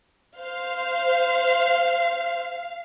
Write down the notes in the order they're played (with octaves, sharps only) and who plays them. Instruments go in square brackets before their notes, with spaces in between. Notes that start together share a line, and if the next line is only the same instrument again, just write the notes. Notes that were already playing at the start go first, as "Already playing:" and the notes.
[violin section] C5 [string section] F5